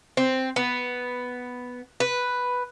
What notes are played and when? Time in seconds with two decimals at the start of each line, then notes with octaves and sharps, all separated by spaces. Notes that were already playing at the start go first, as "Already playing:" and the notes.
0.17 C4
0.56 B3
2.00 B4